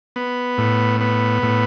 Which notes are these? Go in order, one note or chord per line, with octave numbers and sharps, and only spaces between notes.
B3
A2
B3
A2